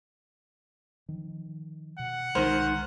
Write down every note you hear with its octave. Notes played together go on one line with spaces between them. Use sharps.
D#3 F3
B2 F#5
C2 D#3 G#3 A#4 C5